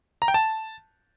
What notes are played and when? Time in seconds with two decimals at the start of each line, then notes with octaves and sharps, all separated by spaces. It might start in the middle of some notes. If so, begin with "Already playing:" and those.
0.22 A#5
0.28 G5
0.34 A5